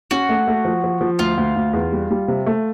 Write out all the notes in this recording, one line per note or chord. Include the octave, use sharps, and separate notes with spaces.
C#4 F#4
A3
A3
F3
F3
F3
D2 F4
D2
D2
E2
G3
G3
C3
A3